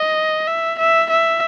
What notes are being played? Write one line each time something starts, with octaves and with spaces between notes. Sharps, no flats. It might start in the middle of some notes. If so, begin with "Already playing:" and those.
Already playing: D#5
E5
E5
E5